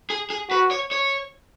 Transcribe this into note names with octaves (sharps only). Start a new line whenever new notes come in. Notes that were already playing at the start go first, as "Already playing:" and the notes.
G#4
G#4
F#4 B4
C#5
C#5